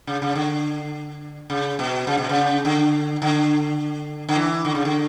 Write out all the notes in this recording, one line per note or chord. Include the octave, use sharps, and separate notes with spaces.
C#3
C#3
D3
C#3
B2
C#3
B2
C#3
D3
D3
D3
E3
D3
C#3
D3